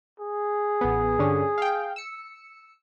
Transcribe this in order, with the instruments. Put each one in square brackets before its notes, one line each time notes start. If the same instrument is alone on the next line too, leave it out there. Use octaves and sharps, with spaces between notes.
[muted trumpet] G#4
[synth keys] A1 B3
G2 D3 C#4
F5 G5
E6 C#7